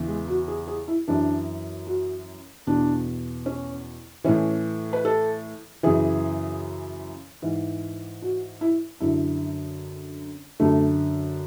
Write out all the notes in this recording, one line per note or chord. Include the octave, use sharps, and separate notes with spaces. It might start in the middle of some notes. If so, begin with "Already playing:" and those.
Already playing: E2 C#3 E3
G#3
F#4
G#4
G#4
E4
F#2 E3 D4
F#4
E2 B2 D4
C#4
A2 E3 C#4
B4
A4
F#2 C#3 E3 G#4
G#2 E3
F#4
E4
F#2 D3 E4
F#2 D3 A3